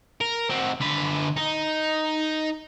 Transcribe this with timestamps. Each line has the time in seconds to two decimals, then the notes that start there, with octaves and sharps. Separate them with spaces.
0.21 A#4
0.50 C4 F#4
0.80 D3 B4
1.36 D#4